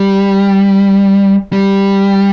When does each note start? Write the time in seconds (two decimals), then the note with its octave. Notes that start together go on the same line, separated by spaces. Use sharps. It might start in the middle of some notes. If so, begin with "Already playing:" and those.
Already playing: G3
1.53 G3